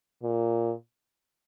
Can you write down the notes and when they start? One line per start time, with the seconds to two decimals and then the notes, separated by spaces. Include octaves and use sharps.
0.23 A#2